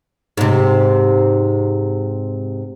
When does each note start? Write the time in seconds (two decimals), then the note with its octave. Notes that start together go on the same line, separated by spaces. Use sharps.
0.37 G#2 C3